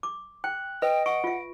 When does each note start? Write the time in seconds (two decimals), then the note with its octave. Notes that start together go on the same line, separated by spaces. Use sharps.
0.03 D6
0.44 G5 F#6
0.82 B4 D#5 G5
1.06 F#5 C#6 D7
1.24 F4 E5